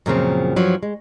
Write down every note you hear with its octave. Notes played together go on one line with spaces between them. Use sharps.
F#2 A#2 C#3 F3 C4
G2 F3 F#3
G#3